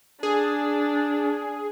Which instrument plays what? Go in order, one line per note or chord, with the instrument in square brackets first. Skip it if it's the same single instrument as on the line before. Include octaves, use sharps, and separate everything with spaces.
[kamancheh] D4 [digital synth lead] G#4